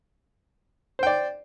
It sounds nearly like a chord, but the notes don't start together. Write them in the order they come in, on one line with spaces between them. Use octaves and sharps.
C5 G5 D5